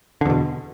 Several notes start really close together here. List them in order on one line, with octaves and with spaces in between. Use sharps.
D3 E2 B2